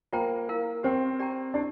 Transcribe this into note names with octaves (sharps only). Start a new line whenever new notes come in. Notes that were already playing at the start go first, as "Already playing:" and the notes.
A#3 F4 C5 G5 A#5
E4 A#4 F5
C4 G4 C5 G5
G4 D5 G5 A#5
D4 E4 G4 D5